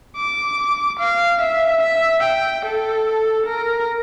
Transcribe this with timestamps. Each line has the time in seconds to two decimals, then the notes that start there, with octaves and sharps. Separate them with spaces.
0.17 D6
0.99 F5
1.41 E5
1.82 E5
2.23 G5
2.65 A4
3.46 A#4